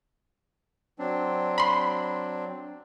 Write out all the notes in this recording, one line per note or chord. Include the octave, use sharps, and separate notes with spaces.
F#3 C4 D4
B5 C6